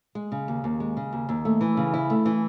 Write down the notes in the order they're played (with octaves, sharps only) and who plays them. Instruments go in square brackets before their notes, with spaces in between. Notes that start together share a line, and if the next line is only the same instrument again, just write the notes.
[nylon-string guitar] G#3
C#3
D#2
D#2
G#3
C#3
D#2
D#2
A3
E3
C#3
E4
A3
E3